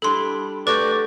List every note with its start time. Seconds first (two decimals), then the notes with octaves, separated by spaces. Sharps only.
0.02 G3 D4 E4 A4 C6
0.67 A3 F#4 G4 B4 D5